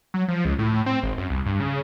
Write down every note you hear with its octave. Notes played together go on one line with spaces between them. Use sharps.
F#3
F3
C#2
A2
A2
C4
G#1
F#2
C2
G2
C#3